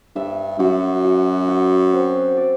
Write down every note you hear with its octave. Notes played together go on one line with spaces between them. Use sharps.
G2 E5
F#2 F#4
F#4
F#4
C4
D5